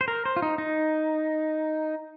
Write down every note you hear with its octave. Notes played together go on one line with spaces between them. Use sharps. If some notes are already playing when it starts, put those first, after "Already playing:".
C5
A#4
C5
F4
D#4
D#4